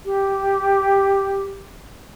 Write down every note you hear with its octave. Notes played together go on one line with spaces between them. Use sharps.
G4